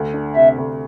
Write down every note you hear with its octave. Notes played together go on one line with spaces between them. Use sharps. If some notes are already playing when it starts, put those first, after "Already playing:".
Already playing: D2
D4
C3 E5
D2